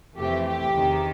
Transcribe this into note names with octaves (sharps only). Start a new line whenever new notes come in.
F2 C3 E3 A3 G4
G4
E2 C3 D#3